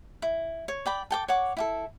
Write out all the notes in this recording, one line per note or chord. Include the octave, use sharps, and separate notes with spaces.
E4
C#5
D5 G5 B5
A4 G5 D6
C#5 F#5 D6
E4 G4 A4